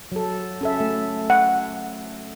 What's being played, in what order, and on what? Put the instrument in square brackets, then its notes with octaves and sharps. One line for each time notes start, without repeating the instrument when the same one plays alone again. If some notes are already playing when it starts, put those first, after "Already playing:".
[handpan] F#3 A4
C#4 A4 E5
A3
[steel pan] F#5